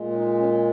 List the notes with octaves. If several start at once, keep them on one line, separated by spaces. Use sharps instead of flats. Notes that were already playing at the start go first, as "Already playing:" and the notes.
Already playing: A#2 G#3
C#4
D#4
C#4